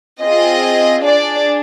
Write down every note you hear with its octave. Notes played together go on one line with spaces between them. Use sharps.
C4 F4 G#4 D#5
D4 G#4 D5